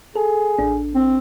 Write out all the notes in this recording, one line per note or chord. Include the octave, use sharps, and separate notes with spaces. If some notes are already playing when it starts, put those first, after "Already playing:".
G#4 A4
A1 D4
C4